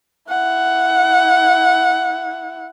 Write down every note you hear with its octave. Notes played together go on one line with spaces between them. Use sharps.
E4 F#5